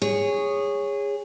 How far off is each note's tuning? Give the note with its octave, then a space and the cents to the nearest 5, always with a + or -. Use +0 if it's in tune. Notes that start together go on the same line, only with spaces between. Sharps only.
G#4 -20 C#5 +0